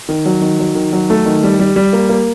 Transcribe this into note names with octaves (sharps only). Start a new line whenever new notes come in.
D#3
F#3
D#3
F#3
D#3
F#3
A3
D#3
G3
G3
G3
A#3
A#3